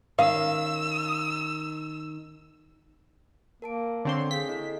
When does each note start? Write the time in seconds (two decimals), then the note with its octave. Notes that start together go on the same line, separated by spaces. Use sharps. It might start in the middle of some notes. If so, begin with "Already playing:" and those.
0.19 D#3 C#4 F5 E6
3.62 A#3 A#4 A5 D7
4.05 D3 C4 C#5 C6
4.31 G#4 F5 G6 B6
4.49 E4 A4 D#5